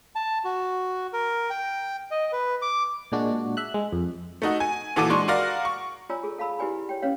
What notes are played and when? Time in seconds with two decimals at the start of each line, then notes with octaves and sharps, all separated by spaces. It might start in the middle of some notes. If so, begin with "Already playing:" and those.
0.16 A5
0.45 F#4
1.13 A#4
1.50 G5
2.11 D#5
2.32 B4
2.62 D6
3.12 A#2 G#3 D4 F#4
3.57 E5 F#6
3.74 G#3
3.92 F2
4.42 A3 D#4 F#4
4.60 G#5
4.96 A#2 E3 F#4 A4 D6 D#7
5.10 G#3 D4 C6 C#6
5.28 F#4 A#4 D5 F5 A#6
5.65 C#6
6.10 F4 C#5 D5 G#5 A#5 E6
6.23 G#4 A4
6.38 A4 F5 A5 B5 E6
6.59 E4 G4 B4 D5 G#5 B5
6.89 C#5 G5
7.02 C#4 B4 C#5 F5